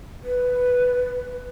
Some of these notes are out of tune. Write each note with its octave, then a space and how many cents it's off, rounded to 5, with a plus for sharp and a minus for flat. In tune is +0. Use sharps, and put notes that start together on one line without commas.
B4 +5